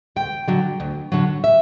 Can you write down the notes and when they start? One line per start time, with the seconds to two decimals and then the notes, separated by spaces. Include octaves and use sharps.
0.16 D2 G5
0.48 D3 F#3
0.80 D2
1.12 D3 F#3
1.44 E5